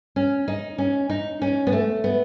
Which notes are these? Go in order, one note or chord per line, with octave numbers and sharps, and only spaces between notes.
C#4
D#4
C#4
D#4
C#4
B3
A3
B3